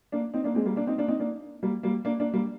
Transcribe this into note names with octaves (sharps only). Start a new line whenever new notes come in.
A#3 D4
C4 D#4
A#3 D4
G#3 C4
G3 A#3
A#3 D4
C4 D#4
A#3 D4
C4 D#4
A#3 D4
G3 A#3
G3 A#3
A#3 D4
A#3 D4
G3 A#3